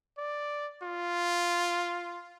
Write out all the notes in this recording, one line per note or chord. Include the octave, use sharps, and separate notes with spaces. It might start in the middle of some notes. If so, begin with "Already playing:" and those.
D5
F4